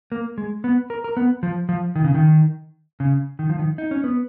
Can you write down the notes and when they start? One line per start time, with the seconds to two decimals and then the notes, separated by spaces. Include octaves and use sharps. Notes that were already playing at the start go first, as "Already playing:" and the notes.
0.12 A#3
0.38 G#3
0.64 B3
0.90 A#4
1.04 A#4
1.17 B3
1.43 F3
1.69 F3
1.95 D#3
2.04 C#3
2.14 D#3
3.00 C#3
3.39 D#3
3.50 F3
3.59 D#3
3.78 D#4
3.91 C#4
4.04 B3